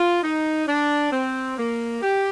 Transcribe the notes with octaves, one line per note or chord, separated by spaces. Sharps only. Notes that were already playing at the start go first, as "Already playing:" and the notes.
Already playing: F4
D#4
D4
C4
A#3
G4